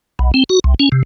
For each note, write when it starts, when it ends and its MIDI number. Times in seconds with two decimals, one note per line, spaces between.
0.19 0.31 35
0.34 0.44 60
0.50 0.59 66
0.64 0.74 36
0.80 0.89 61
0.92 1.03 48